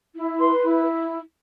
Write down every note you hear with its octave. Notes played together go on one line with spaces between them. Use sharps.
E4
B4 C6
E4